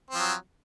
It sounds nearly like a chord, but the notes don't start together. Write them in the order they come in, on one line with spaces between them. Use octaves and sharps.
C4 F3 F#3